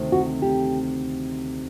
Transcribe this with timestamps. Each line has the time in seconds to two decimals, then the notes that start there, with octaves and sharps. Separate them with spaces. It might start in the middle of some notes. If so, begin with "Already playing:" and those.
Already playing: D2 C3 D#3 A3 C4
0.12 F#4
0.42 G4